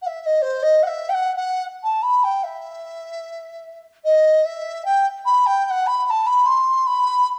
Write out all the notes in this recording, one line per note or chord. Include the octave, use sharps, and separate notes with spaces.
F#5
E5
E5
D#5
C5
D#5
F#5
E5
G5
F#5
F#5
A5
B5
G5
E5
D#5
E5
G5
B5
G5
G5
F#5
B5
B5
A5
B5
C6
B5